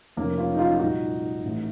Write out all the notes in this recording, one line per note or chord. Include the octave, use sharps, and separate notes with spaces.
F1 F2 C#3 A#3 C#4
C#4 F4
D#4
C#4 F4
F4
C2 A#2 D#4 F#4
A1 A2